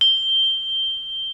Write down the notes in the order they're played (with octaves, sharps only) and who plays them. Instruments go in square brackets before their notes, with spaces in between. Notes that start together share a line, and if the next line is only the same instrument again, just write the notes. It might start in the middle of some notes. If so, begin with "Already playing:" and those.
[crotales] G7